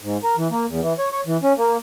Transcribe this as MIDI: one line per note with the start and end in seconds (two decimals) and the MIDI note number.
0.01 0.17 44
0.24 0.36 70
0.37 0.48 52
0.51 0.66 58
0.69 0.81 40
0.81 0.93 52
0.99 1.09 73
1.12 1.21 73
1.27 1.37 52
1.43 1.53 61
1.58 1.77 58